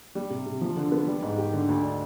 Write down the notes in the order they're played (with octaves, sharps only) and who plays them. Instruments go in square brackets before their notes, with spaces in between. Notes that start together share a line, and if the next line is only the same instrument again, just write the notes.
[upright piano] G3
C3
C3
F3
D3
B3
G3
G#2
G4
D3
D2
D4